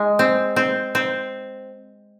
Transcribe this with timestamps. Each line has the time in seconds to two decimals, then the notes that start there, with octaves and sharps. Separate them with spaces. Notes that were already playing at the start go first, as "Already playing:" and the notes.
Already playing: G#3
0.19 C4
0.56 C4
0.95 C4